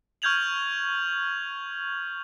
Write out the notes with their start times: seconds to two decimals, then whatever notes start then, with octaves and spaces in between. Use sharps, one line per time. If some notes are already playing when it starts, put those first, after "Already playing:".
0.22 C#6 F6 G6 G#6 F7 F#7